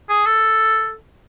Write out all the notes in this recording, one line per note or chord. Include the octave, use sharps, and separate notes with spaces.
G#4
A4